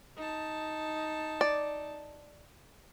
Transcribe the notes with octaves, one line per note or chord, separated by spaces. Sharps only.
D#4 A5
D5